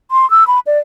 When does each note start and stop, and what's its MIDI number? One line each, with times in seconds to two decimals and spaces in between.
0.11 0.29 84
0.30 0.47 88
0.47 0.59 83
0.67 0.79 74